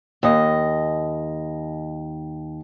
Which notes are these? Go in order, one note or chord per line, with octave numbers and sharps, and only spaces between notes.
D#2 D#5